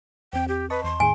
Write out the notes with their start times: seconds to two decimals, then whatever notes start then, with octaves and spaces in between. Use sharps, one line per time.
0.33 E2 C4 G5
0.48 G4
0.70 B4 D#5 A5 C#6
0.84 E2 C6
1.00 A2 D#3 G#4 G#5